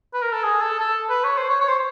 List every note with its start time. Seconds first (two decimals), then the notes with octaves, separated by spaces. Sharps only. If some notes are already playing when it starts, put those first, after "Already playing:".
0.13 B4
0.22 A#4
0.32 A4
0.44 G#4
0.61 A4
0.79 A4
1.09 B4
1.24 C#5
1.37 C5
1.49 C#5
1.61 C#5
1.68 C5